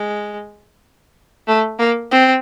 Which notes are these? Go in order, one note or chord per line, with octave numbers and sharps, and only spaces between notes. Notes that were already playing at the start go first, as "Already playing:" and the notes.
Already playing: G#3
A3
A#3
C4